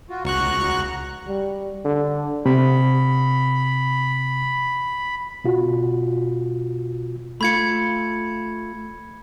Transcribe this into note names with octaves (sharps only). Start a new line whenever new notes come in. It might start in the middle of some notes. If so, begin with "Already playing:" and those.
F4 F#4
C#2 F#4 A#5 C#6 F#6
G3
D3
C3 B5
B2 F4 F#4
A3 F4 B5 G#6 C#7